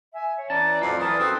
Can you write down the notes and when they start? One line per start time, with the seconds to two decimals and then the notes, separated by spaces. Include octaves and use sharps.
0.13 E5 G#5
0.37 C#5
0.50 E3 C#4 D5 A5 A#5
0.81 F2 A2 F#3 A4 C7
0.99 E3 A#4 B4 A5 D#6 F6
1.19 F#2 C4 F#4 A4 E6